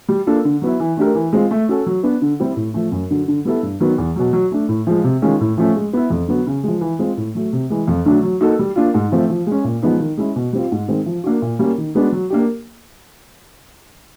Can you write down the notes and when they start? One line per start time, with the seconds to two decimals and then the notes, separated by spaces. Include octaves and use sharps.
0.09 G3
0.26 A#3 D4 F4 A4
0.45 D3
0.62 F#3 B3 E4
0.80 E3
0.97 A3 D4 G4 A#4
1.15 E3
1.33 G#3 C4 F4
1.51 A3
1.69 C#4 F#4 A4
1.86 F#3
2.03 B3 D4
2.22 D3
2.39 G3 C4 E4 G4
2.56 A2
2.74 F3 A3
2.91 F#2
3.10 D3 F#3
3.28 D3
3.45 G3 B3 E4 A4
3.63 G2
3.80 D#3 F#3 B3
3.98 E2
4.16 B2 F#3
4.33 F#3
4.52 A3 D4
4.68 A2
4.87 F3 G#3
5.04 C3
5.22 D#3 G#3 C#4 F4
5.40 A2
5.58 F3 A3 C#4
5.76 G#3
5.93 B3 E4
6.10 F2
6.28 D3 F#3 B3
6.47 C#3
6.63 F3 G#3
6.81 E3
6.99 G#3 C4 F4
7.17 A2
7.35 F#3 A3
7.53 C3
7.70 E3 G#3
7.87 F2
8.06 D3 F#3 A3 D4
8.23 F#3
8.41 A#3 D#4 F#4 A4
8.59 G3
8.76 A#3 D4 F4
8.94 G#2
9.12 F3 A3 C4 F4
9.30 F3
9.47 G#3 C#4
9.64 A#2
9.82 F3 G#3 B3 D#4
10.00 D#3
10.17 G#3 C#4 E4
10.36 B2
10.53 G3 C4 F4
10.72 G#2
10.88 D#3 G#3 C4
11.06 F3
11.24 A#3 D4 F#4
11.42 A#2
11.59 G3 A#3 C#4
11.78 D#3
11.95 G#3 B3 D4 F#4
12.12 F#3
12.30 A#3 D4 G4